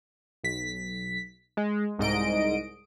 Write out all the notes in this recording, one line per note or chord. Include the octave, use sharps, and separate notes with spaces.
B1 B6
G#3
C2 G#2 D#5 D7